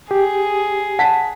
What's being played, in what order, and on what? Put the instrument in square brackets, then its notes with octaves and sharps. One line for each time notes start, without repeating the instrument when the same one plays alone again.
[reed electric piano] G4 [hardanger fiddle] G#4
[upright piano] F#5 A5 B6